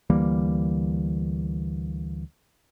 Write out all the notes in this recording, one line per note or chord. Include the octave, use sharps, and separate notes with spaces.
D2 E3 G3 A#3